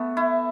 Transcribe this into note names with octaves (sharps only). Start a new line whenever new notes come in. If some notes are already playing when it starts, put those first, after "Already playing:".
Already playing: A3 B3
E4